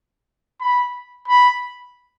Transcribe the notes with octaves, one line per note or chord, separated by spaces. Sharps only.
B5
B5